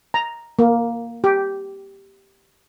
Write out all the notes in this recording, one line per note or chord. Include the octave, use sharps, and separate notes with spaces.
A#5
A#3
G4